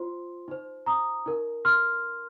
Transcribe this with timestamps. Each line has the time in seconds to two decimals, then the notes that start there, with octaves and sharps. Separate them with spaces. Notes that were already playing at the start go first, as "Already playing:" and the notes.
Already playing: F4 C5 C6
0.48 D#4 C5
0.86 A#5 D#6
1.26 D#4 A#4
1.65 C6 F6